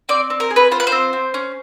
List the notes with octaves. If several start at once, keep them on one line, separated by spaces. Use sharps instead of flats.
C4 D5
C4
A#4
G#4
B4
F4 C5
B4
C5
C4
C4
C#4